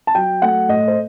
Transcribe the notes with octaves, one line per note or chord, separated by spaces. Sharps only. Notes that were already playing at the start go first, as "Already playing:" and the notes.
A5
F#3 G5
A3 F#5
A2 D#5
C5